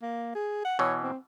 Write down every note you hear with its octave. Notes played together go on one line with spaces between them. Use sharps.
A#3
G#4
F#5
B2 E3 C#5
C4